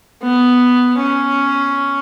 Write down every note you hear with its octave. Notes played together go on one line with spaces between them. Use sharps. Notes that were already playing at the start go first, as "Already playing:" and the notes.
B3
C#4